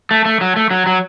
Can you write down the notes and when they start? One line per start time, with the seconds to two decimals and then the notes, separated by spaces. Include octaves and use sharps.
0.11 A3
0.25 A3
0.41 F#3
0.56 A3
0.71 F#3
0.86 F#3